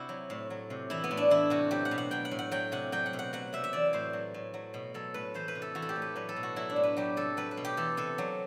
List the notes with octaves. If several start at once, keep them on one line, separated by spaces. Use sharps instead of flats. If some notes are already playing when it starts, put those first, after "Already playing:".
Already playing: C3 E4 F#4
F#3
A2
F#3
C3
E3 E4
B3
A2
D4
E3 E4
C3 F#4
F#3 G4
F#5
B2
F#5
F#3 G5
F#5
A2
F#5
F#3 G5
C3 F#5
F#3 G5
F#5
B2
F#5
F#3 F#5
C3 E5
E5
E3 D5
A2 C5
F#3
A2
F#3
B2
F#3 A4
A2 B4
E3 C5
B4
C3
A4
E3 F#4
A4
G4
A2
B4
F#3 B4
A4
B2
F#4
F#3 E4
D4
A2
B4
F#3 G4
C3 A4
F#3 B4
B4
B2
G4
E3 A4
C3 A4
F#3